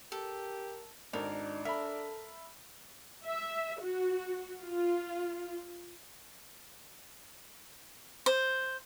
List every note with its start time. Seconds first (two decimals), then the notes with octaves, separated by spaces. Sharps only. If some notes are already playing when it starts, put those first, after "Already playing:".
0.12 G4 A4 A#4
1.13 G#1 D4 D#4 A4 A#4
1.65 A4 A#4 E5 B5
3.25 E5
3.81 F#4
4.60 F4
8.26 C5